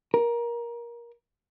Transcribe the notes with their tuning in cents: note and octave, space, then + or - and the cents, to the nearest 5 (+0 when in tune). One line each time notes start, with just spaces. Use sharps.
A#4 +20